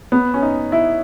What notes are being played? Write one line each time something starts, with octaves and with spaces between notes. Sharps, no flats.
B3
C#4
D#4
E4